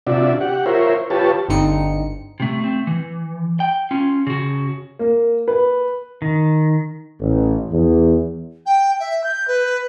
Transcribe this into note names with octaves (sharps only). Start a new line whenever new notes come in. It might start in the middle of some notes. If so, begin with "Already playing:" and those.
C3 D4 F4 F#4 D5 E5
G4 F#5
F4 A#4 C5 C#5 E5
F4 G4 B4 C#5 A5
G1 G2 D3 C4 D#4 C#7
C3 A3
A3 C4
E3
G5
C#4 F4
C#3 F#4
A#3
B4
D#3
A1
E2
G5
E5
G6
B4